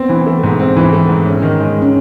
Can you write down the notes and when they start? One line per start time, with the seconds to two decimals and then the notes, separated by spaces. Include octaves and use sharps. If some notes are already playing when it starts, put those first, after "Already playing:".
Already playing: B3 C4
0.09 E3
0.26 A3
0.43 G#2
0.59 C4
0.77 E3
0.93 A3
1.09 G#2
1.26 C#4
1.42 D#3
1.60 G#3
1.82 C#4